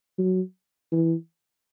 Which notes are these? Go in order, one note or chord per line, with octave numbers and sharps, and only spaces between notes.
F#3
E3